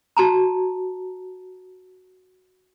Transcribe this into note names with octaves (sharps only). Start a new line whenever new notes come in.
F#4 A5 A#5